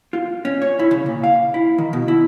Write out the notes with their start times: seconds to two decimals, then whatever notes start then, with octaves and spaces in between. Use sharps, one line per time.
0.13 F4
0.45 C#4
0.62 C#5
0.79 E4
0.91 C#3
1.06 A#2
1.24 F5
1.54 E4
1.78 D#3
1.93 B2
2.08 E4